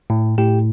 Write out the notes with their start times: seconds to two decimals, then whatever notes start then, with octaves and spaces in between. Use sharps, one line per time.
0.10 A2
0.38 A2 G4 G5